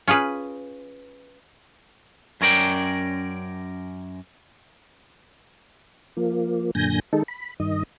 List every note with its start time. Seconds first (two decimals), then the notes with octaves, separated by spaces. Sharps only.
0.08 C#4 F4 G#4 B4
2.41 F#2 C#4 A#4 D5 G5
6.17 F3 A#3
6.75 F#2 A#2 D3 G#5 G6 A#6
7.13 D#3 G#3 D#4 A4
7.28 B5
7.60 G2 D#3 D#5